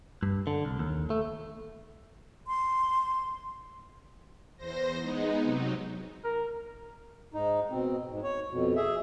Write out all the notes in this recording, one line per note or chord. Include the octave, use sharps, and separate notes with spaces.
G2
D3
C2
D#2
A3
C6
E2 C5 A#6
G#3 B3 D#4
C3 F#3 D#4
A#4
G#2 D#4
B2 C4
G#2
C#5
F2 B2
G#4 E5